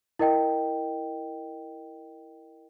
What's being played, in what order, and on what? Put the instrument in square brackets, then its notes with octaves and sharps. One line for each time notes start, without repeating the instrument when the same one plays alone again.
[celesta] E4 A#4 D#5 G5